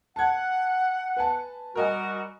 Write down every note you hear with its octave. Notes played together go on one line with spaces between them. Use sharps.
F#5 A5 G#6
B4 G#5 A5
G3 F#4 A#4 D#5 G#5